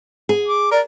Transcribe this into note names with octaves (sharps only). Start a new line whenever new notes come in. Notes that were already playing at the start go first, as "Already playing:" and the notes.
G#4
D6
A#4 D5